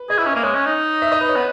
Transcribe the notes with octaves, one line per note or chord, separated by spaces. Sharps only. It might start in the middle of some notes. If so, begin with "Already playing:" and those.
Already playing: B4
G#4 D#5
E4 E5
C#4
A#3 D#5
G#3 C#5
C#4
D#4
E5
D#5
B4
C#5
B3